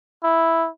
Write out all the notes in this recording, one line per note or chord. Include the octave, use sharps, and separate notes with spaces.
E4